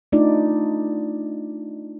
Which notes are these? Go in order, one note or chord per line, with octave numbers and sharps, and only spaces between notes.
A3 D4 D#4 F4 D5